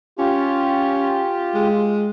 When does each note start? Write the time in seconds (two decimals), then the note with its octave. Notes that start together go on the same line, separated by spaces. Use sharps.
0.19 C#4 F4 G4
1.55 G#3